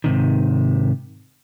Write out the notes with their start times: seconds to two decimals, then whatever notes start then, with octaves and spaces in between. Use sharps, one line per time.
0.04 G#2 C3 D#3